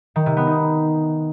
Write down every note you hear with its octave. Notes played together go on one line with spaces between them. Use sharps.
D#3
C3
B3
D#4